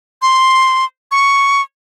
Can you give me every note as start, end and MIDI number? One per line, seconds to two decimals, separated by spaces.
0.22 0.85 84
1.11 1.62 85